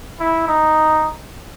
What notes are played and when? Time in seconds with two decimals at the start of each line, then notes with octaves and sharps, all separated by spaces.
0.20 E4
0.48 D#4